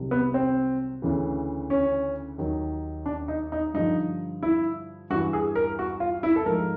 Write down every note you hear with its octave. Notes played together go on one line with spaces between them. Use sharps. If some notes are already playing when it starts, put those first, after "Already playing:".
Already playing: C2 C3 D#3 F#3
B3
C4
D2 C#3 E3
C#4
D#2 D#3 F#3
D4
D#4
D#4
G2 D3 F3 D#4
E4
G2 E3 F#4
G#4
A#4
F#4
F4
E4
A4
G#2 F3 A#4